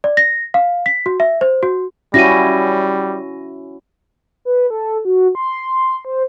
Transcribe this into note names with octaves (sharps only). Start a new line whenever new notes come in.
D5
A#6
F5
B6
F#4
E5
C5
F#4
G3 C#4 E4 F#4 A#6 D#7
B4
A4
F#4
C6
C5